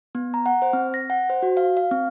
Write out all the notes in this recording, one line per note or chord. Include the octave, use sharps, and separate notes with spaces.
B3
A#5
F#5
C5
C4
A#6
F#5
C5
F#4
F5
F5
C4